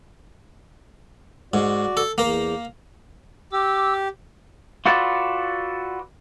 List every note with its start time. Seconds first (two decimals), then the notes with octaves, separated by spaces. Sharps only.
1.54 G#2 F#4 D5
1.97 A4
2.18 E2 A#3 A#4
3.52 G4 D6 E6
4.86 F4 F#4 A4 B4 D5